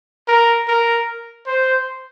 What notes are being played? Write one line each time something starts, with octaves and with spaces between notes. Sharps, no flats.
A#4
A#4
C5